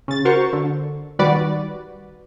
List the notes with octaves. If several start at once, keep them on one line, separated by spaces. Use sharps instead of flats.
C#3 A6
F#4 A#4 C5 C#6
D3
D#3 G3 F#4 B4 D5